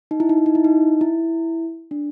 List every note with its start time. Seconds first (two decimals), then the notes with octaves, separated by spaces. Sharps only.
0.11 D#4
0.20 E4
0.29 D#4
0.38 E4
0.46 D#4
0.55 E4
0.64 D#4
1.01 E4
1.91 D4